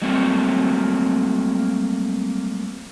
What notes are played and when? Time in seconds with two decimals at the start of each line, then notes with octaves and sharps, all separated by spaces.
0.02 F#3 G3 A3 A#3 C4 F#4